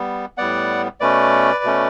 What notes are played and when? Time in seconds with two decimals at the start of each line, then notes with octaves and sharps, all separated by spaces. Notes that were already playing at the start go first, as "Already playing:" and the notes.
Already playing: G3 B3
0.37 A2 G3 B3 D5 F#5
1.00 B2 A3 C#4 B4 D5
1.64 B2 A3 C#4